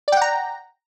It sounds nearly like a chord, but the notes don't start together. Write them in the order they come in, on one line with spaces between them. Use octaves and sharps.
D5 G5 F#5 A#5